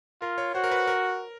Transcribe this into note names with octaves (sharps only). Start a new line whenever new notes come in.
F4 A#4
C#5
F#4 C5
A#4
B4
A#4